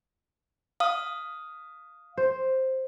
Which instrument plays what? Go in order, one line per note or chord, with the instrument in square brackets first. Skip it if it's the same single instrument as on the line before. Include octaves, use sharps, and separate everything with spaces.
[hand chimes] F5 D#6
[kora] C5